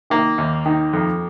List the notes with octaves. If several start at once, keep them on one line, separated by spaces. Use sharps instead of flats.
D#3 A#3
D#2
D#3
F2